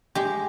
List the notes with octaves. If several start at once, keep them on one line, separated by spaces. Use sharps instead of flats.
G#3 G4